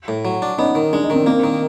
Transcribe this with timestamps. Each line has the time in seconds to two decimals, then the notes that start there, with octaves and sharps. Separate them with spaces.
0.08 A2
0.25 F#3
0.42 D4
0.58 B3 C#4 D#4
0.75 D#3
0.93 G#3 D4
1.03 D#4
1.10 D#3 C4 D4
1.26 A#3 C4 D4
1.44 D#3